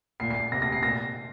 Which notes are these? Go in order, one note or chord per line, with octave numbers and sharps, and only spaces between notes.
A#2 C7
C7
C3 A#6
A#6
C7
A#2 A#6